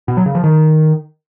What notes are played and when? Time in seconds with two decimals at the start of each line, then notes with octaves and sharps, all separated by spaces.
0.08 B2
0.17 F#3
0.26 C#3
0.35 F3
0.44 D#3